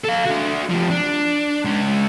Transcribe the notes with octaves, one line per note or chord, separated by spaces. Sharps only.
A4 F5
D4 F#4
F3 G4
D4
G#3 C#4